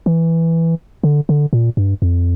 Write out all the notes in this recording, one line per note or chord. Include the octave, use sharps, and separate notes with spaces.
E3
D3
D3
A#2
G2
F2